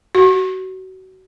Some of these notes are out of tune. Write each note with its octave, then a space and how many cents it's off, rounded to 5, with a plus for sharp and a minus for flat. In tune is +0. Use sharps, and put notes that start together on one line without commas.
F#4 +30